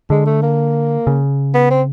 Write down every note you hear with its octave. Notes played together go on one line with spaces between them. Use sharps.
D3 G#3
A3
A#3
C#3
B3
C4